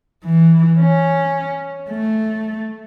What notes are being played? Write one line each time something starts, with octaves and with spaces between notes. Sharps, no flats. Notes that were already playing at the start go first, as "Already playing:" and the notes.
E3
C#4
A3